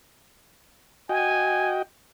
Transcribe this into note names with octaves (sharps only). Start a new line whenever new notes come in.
F#4 D#5 G5 G#5